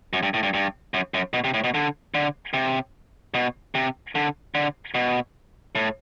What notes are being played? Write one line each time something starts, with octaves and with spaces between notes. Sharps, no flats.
F#2
G2
A2
G2
G2
F#2
F#2
B2
C3
A2
B2
D3
D3
C3
B2
C3
D3
D3
B2
A2